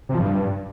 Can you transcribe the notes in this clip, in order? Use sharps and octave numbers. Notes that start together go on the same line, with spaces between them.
C3
F3
G2